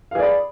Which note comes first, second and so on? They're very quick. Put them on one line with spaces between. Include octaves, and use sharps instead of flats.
F5 G#4 D5 B5